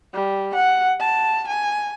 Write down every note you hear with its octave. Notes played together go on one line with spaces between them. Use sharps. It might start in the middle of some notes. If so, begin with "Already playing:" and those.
G3
F#5
A5
G#5